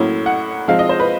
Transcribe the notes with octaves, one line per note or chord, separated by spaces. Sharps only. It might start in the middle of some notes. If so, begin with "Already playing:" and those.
Already playing: A2 F#3 A#3 C#4 E4
F#5
F3 G#3 C4 D#4 F5
D#5
C5
B4